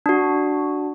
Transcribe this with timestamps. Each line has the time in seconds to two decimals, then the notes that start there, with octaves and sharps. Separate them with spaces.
0.06 D4 F#4